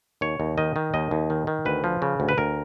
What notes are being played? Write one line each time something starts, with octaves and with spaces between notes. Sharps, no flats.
D#2 C#5
D#2
D#3 D#5
D#3
D#2 D#5
D#2
D#3
D#3
D2 B4
F3
C#3
D2
B4
D2 A#4